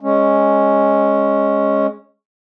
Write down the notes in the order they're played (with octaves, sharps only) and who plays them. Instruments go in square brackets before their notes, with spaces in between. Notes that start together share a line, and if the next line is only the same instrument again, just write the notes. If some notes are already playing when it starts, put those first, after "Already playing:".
[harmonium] G#3 C#4